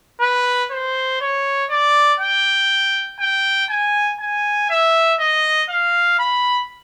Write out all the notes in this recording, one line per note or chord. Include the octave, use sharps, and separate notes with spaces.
B4
C5
C#5
D5
G5
G5
G#5
G#5
E5
D#5
F5
B5